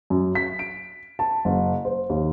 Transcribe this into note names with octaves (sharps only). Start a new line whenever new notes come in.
F#2
B6
D7
A5
F#1
C5
D#2